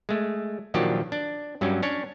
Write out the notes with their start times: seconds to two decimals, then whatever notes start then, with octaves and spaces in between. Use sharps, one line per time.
0.09 G#3 A3
0.74 A#2 D#3 F3 F#3 D4 G4
1.12 D4
1.61 G2 F#3 G3 C#4
1.83 C#4 D4 C#5